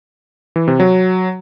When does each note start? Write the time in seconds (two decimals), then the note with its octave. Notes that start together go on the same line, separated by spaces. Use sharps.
0.56 E3
0.68 C3
0.80 F#3